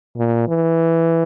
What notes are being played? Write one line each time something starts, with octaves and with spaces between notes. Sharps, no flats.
A#2
E3